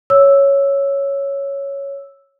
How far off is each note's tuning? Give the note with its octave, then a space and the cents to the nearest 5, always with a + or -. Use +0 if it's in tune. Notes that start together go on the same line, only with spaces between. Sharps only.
C#5 +0 E6 +0